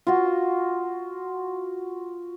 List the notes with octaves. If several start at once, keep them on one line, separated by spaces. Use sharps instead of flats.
F4 F#4